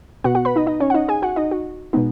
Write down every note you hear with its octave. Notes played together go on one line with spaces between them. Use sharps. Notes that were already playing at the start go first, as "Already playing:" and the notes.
B2 B3 F#4 F#5
F#4 F#5
B4 B5
D#4 D#5
D#4 D#5
C#4 C#5
F#5
D#4 D#5
G#4 G#5
F#4 F#5
D#4 D#5
F#4
B2 G#3 B3 D#4